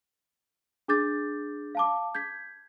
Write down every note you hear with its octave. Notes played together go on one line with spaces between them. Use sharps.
D4 G#4 D6 G6 A6
F5 A5 D6
G6 G#6 B6